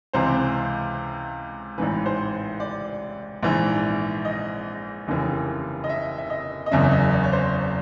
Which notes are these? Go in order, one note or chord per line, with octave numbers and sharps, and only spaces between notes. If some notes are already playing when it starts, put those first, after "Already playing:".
C#2 C3 E3 C5
A1 G#2 E3 B4
C5
D5
A#1 G#2 E3
D#5
F1 D#2 C#3 E3
D#5
E5
E5
D#5
D#5
F#1 E2 C#3 E5
D#5
D5
C#5
C5